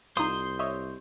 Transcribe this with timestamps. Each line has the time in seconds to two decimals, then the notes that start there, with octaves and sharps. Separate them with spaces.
0.17 C2 D#4 F4 C5 C6 D#6
0.59 C#5 D#5 E5